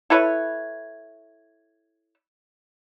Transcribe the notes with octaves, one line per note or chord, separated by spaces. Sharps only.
E4 A4 B4 C#5